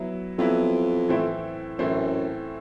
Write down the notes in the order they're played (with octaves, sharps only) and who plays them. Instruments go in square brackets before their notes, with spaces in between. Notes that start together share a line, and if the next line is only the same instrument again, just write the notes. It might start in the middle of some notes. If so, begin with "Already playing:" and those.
Already playing: [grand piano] F#3 B3 E4
[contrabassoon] F2 [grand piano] F#3 B3 E4
[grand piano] A2 E3 A3 C4 E4
[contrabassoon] F#2 [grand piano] A2 E3 A3 C4 E4